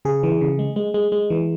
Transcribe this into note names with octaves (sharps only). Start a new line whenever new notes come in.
C#3 G#4
E3
C#3
G#3
G#3
G#3
G#3
E3